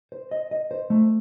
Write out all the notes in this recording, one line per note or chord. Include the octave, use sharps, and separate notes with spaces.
C5
D#5
D#5
C5
A3